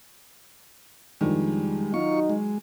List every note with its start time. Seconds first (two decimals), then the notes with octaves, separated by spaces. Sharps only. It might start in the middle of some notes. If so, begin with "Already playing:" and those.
1.21 F2 D#3 G3 G#3 D4
1.94 F#3 D#4 F4 F#4 C#6
2.29 G#3